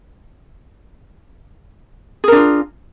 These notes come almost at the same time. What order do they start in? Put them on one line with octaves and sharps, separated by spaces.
G#4 A#4 D4 F4